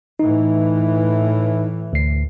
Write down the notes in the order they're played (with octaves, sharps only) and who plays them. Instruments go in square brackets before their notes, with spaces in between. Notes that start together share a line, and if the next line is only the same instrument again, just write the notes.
[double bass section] A2 E3 [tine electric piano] D#4
[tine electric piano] D2 C7